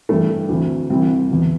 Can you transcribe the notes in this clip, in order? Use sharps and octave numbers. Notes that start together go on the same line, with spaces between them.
G2 E3 A3
D2 C3 E3
C2 C3 E3 C4
E2 B2